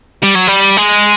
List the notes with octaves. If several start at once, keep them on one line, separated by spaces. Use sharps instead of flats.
G3
F#3
G3
G#3